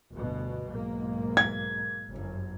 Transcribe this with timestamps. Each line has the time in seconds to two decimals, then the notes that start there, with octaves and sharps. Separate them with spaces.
0.12 G1 D2 B2
0.70 B1 G#2 A#3
1.37 G#6
2.09 G1 F#2